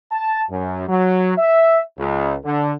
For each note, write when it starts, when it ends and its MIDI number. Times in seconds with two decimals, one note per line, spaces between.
0.12 0.43 81
0.50 0.84 42
0.89 1.34 54
1.38 1.81 76
1.99 2.35 37
2.45 2.73 50